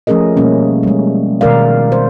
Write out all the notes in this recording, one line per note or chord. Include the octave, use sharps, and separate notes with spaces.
F3 A3 C#4 G#4 A#4 D#5
B2 G3 A#3 C#4
G3 G#3
B2 D#3 G#3 A#4 D5 F5
C5